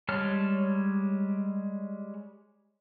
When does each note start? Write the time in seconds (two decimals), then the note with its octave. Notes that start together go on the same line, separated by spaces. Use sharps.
0.09 G3 G#3 C#5 A5 F6